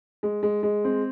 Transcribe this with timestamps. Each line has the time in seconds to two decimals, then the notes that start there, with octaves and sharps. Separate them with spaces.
0.23 G#3
0.43 G#3
0.63 G#3
0.85 C4